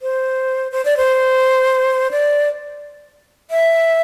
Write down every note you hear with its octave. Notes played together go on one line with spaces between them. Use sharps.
C5
C5
D5
C5
D5
E5